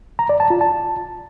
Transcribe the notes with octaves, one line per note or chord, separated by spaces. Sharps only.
A#5
D5
A5
F4
A5